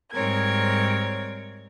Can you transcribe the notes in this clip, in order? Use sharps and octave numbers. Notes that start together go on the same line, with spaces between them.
G#2 G3 C4 A#4 C#5 G#6